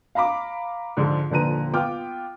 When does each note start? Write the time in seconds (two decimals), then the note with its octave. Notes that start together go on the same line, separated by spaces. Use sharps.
0.15 F5 A#5 B5 D6
0.97 G#2 D3 F3 G#3
1.30 D#1 D3 F3 B4 A#5 D#7
1.73 B3 F4 G5 D6 F6